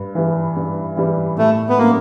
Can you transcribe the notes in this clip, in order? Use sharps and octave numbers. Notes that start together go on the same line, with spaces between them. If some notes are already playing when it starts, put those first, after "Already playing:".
Already playing: G2
E3 G3
G2
E3 G3
A2 A3
B3
F#3 A3 A#3 C#4